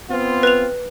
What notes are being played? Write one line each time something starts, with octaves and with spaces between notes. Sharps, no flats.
B3 C4 F4
B4 F7